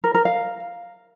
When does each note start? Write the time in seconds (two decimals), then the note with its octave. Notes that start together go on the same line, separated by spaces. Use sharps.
0.04 A#4
0.14 A#4
0.25 F5